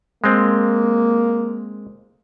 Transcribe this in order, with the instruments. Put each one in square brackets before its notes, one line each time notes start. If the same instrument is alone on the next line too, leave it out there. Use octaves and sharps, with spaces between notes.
[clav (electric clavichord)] G#3 C4 [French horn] A#3